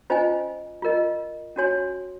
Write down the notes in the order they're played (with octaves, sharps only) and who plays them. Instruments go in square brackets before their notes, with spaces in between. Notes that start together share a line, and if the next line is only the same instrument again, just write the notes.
[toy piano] C#4 F4 C5 D#5 G#5
F4 A#4 D#5
C#4 F#4 C#5 G#5 C6